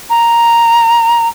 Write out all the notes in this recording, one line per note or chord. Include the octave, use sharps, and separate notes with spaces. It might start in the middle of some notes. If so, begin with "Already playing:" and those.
A#5